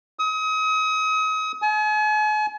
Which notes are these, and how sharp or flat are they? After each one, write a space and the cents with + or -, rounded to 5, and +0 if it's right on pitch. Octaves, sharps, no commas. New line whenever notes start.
D#6 +35
G#5 +40